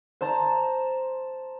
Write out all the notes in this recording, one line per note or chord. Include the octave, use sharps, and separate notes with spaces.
C5 A5 A#5